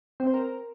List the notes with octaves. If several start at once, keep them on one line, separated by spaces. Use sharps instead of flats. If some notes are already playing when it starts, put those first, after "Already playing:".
C4
C5
A#4